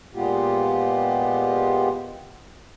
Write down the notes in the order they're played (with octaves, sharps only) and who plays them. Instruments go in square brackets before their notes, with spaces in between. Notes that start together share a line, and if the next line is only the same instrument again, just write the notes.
[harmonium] A#2 G#3 B3 F4 G4